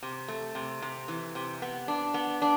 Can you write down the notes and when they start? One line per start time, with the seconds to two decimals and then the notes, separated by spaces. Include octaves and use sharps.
0.03 C3
0.28 A3
0.55 C3
0.82 C3
1.08 E3
1.35 C3
1.62 B3
1.88 D4
2.14 B3
2.42 D4